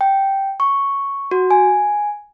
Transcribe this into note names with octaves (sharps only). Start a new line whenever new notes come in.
G5
C#6
F#4
G#5